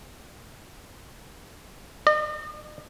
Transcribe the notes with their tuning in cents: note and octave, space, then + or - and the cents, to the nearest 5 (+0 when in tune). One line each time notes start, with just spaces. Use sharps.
D#5 -45